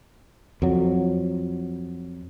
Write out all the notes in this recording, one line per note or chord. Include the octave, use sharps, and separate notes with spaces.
F2 F#3